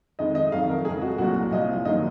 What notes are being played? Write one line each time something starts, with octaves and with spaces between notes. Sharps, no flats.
F2 D#3 G#3 D#5
D#5
F2 D#3 F#3 F5
A#4
F2 C#3 G#3 G#4
F#4
C2 A#2 F#3 A#3 F#4
C2 A#2 F3 D#5
F#2 D#3 F#3 A#3 D#5